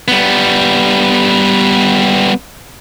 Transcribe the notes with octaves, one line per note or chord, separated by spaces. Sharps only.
G3 B3